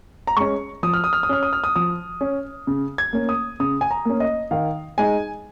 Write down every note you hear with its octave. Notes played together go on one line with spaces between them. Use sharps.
A#5
G#3 C#4 C#6
F3 D#6
F6
D#6
F6
D#6
C#4 F6
D#6
F6
D#6
F3 D#6
C#4
C#3
G#6
A#3 C#4
D#6
C#3 D#6
G#5
A#5
A#3 C#4
D#5
D#3 F5
G#3 D#4 G#5